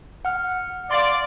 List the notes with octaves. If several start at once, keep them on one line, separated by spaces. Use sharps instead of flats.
F#5 F6
D5 F5 C6